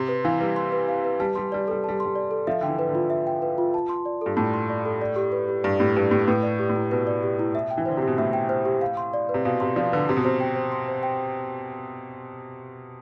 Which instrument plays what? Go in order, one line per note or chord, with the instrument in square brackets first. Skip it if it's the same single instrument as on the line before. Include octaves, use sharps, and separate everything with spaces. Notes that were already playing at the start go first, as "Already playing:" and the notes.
Already playing: [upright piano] C3 [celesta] C6
[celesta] B4
[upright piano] E3 [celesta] F5
[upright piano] G3 [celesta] B4
[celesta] C6
B4
F5
B4
[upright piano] G3 [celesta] A5
[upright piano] G3 [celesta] C6
[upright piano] G3 [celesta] D5
[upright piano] G3 [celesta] A4
[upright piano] G3 [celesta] A5
[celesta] C6
[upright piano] G3
[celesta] D5
A4
[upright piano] F3 [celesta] E5
[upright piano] D3 [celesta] G5
[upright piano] E3
[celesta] B4
[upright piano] D3
[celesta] F4
E5
G5
B4
F4
A5
C6
D5
[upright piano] G2 [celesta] A4
[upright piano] A2 [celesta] A5
[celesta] C6
D5
A4
D5
G4
B4
G4
[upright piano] G2 [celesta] D5
[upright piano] A2 [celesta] G4
[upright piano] G2 [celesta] B4
[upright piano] A2 [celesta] G4
[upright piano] A2 [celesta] B4
[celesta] D5
G4
[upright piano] A2
[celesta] E4
[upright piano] B2 [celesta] B4
[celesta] D5
G4
E4
E5
G5
[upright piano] E3
[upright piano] D3 [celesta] C5
[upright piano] C3
[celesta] G4
[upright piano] B2
[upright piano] A2 [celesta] E5
[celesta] G5
C5
G4
F5
C6
D5
B4
[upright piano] C3
[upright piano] B2 [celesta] F5
[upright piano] C3 [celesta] C6
[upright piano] F3 [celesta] D5
[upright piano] D3 [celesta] B4
[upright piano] C3 [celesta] C6
[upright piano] B2
[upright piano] C3 [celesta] C5
[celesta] G5
C5
C6
C5
G5